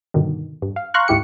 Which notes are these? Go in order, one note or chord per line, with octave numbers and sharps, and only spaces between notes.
G2 B2 D3 D#3
G2
F5
F5 A#5 C6 C#6 F6 F#6
D2 G#2 E4 G4 C#7